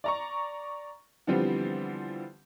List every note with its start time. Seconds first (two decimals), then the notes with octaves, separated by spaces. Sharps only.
0.04 D5 A#5 C#6
1.27 D3 E3 F3 G3 B3 C4